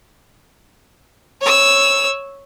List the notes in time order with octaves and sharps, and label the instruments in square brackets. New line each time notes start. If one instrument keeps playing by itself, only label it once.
[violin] C#5 E6